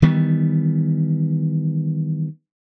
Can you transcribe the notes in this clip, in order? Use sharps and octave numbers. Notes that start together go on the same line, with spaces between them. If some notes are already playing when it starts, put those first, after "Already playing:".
D#3 E3 G3 B3